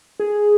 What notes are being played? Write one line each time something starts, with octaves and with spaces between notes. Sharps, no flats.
G#4